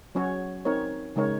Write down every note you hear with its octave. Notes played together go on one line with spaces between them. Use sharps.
F#3 C#4 F#4 C#5
C4 D#4 A#4 C#5
C#3 G#3 D#4 A#4 C#5